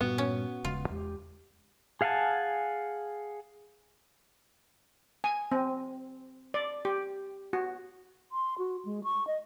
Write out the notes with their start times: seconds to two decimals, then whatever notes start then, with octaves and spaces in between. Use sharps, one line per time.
0.01 G2 A#2 B3 F#4
0.18 C#4
0.65 D#1 C#3 G#3 F4
0.90 E2 G#3 G4
2.01 G#4 F5 F#5 G#5 A5
5.24 G#5
5.52 C4
6.54 D5
6.85 G4
7.53 F#4
8.32 C6
8.58 F#4
8.85 G#3
9.04 C#6
9.27 D#5